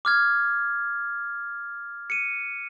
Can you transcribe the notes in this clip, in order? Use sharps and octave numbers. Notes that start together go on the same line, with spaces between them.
D6 F6 G#6
C#7 D#7